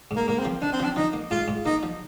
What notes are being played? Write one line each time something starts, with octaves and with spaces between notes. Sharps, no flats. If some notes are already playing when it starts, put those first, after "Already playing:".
G#2
A#3
G#2 A#3
C4
F3
D4 D#4
C4
F3 D4
F3 D#4
A#3
G#2 F4
G#2
A#3 D#4
F3